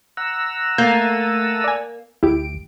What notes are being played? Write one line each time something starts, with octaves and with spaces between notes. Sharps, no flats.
F#5 A#5 E6
A3 A#3 G6 A6 D#7
D5 G#5
D2 E4 G4 D7